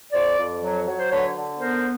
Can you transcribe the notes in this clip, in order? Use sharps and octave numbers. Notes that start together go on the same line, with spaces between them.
F2 C5 D5
F2
F#3
F#3
C5
D3 B4 C#5
D3
B3 A#4 C5